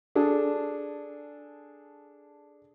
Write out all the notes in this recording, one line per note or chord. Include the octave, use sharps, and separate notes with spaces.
D4 G#4 A4